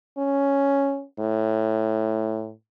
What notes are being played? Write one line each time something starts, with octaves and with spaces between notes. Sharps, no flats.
C#4
A2